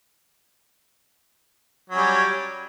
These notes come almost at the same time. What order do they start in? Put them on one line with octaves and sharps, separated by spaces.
F#3 C#4 G3